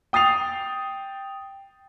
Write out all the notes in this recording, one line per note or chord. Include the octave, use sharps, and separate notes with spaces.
G5 D#6 A6 C7 F7